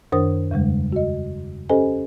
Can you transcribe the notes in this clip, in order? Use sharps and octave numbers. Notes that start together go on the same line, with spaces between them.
F#2 D#3 D4 A#4 C5 D#6
E2 C#3 G3 G#3
F#4 D#5
C#4 G4 A4 C5 D#5 G#5